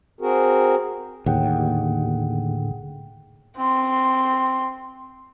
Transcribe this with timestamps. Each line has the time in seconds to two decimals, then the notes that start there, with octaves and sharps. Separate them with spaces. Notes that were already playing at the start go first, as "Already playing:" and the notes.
0.21 C4 F#4 G#4 A#4
1.26 D#2 A2 D3 G#4 F#5 G5
3.57 C4 C6